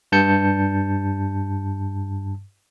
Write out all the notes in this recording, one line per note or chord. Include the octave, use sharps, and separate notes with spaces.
G2 A5 G6 C#7